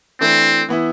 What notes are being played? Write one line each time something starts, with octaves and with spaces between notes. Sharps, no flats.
E3 A3 C4 D4
E3 B3 E4